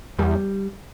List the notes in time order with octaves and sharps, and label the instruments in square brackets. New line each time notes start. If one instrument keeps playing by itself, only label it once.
[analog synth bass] E2 [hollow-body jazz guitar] G3